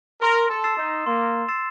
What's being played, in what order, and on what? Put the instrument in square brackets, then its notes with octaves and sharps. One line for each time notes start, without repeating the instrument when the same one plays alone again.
[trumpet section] A#4 [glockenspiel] C6
[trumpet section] A4
[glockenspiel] E6 A6 C7 E7
[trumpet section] D#4
[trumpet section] A#3 [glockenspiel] C6
[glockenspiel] E6 A6 C7 E7